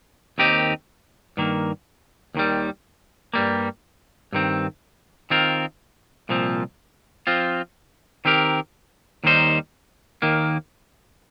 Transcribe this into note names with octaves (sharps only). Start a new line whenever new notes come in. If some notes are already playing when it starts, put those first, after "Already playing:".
D#2 D#3 C4 D#4 G4
G2 D#3 A#3
D#2 D#3 G3
G2 G3 A#3
G2 D#3 C4
D#3 C4 F4 A#4
C2 A#2 F3 C4
F3 C4 F4
D#3 C4 G4 A#4
D#2 D#3 G3 D#4 C5
D#2 D#3 A#3